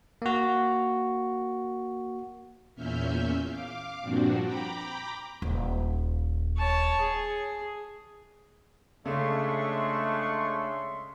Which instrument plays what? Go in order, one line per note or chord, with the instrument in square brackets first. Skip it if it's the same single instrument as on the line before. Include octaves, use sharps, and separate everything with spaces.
[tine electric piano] A#3 F#4
[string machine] E2 A#2 C#4 E5 F6 G6
F5 D6
G2 A#2 F3 C4 D4 F#4
G5 A#5 B5 D6
[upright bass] D#1
[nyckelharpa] C#5 A5
G#4
[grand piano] C#3 [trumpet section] G#3 D4 C#6 [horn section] A3 [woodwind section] C#5 E5 C6